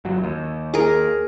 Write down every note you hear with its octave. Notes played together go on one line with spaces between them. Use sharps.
G1 F#3
D#2
G#4 A#4